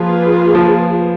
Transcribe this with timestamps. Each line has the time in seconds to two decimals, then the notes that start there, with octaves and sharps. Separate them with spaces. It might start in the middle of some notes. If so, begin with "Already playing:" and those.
Already playing: F3 A#3 F4 G#4 B4
0.55 F3